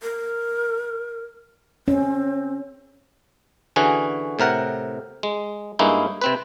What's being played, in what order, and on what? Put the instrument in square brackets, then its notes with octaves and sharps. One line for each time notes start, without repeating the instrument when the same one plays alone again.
[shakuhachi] A#4
[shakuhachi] C4 [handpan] C#4
[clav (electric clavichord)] D3 E3 C#4 F#4 G#4
A2 C3 A#4 F#5
G#3
G2 G#3 A#3 C#4 D#4 E4
C3 C4 B4